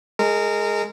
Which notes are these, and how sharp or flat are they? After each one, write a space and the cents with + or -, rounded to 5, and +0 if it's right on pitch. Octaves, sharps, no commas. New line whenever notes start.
G#3 +0 A#4 -25